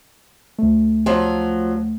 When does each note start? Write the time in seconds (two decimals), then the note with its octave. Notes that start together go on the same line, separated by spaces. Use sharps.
0.58 D2 A3
1.06 F3 F#3